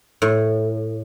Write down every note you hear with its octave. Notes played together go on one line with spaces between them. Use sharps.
A2